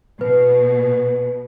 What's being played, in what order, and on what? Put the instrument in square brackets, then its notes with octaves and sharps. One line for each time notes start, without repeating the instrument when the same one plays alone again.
[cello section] B2 [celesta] B4